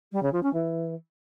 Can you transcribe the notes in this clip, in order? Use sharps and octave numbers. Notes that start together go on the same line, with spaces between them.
G3
C#3
F3
C#4
E3